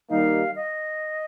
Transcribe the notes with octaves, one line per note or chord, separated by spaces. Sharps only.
D#3 G3 A#3 D#4 G4 F5
D#5